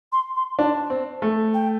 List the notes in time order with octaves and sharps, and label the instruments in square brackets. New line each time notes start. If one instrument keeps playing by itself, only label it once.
[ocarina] C6
C6
[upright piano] D4 [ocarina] A5
[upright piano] C4
A3
[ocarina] G5